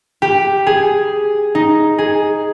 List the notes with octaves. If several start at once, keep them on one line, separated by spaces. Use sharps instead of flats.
G4
G#4
D#4
G#4